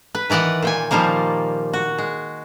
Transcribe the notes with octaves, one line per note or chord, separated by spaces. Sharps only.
B4
D#3 E3 D5 D#5 F#5
A#2 G5 G#5
A#2 D#3 F3 G3 A#3
F#4
G#3